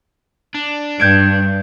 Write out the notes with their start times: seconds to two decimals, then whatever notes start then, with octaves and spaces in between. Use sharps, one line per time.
0.55 D4
1.00 G2 G6 G#6 D7